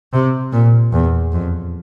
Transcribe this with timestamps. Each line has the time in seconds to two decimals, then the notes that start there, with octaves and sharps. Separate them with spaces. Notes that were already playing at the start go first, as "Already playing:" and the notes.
0.13 C3
0.53 A#2
0.93 E2
1.32 F2